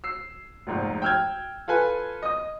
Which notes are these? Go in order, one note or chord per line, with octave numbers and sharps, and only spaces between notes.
E6 C7
F1 A#1 G#2
G5 E6 F6 G6 G#6
F4 A4 B4 G#5
D#5 D#6